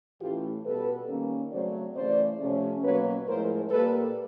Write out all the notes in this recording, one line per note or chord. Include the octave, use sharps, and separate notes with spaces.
A2 E3 A3 C#4 F4 G4
B2 G3 B3 A4 B4
D#3 G3 A#3 C#4
C#3 F#3 A3 C4 C5 D5
C#3 E3 A3 C5 D5
C3 F3 A3 C#4
B2 F#3 A#3 C#4 B4 C#5
A2 F3 G#3 A#4 C5
A#2 G3 A#3 A4 B4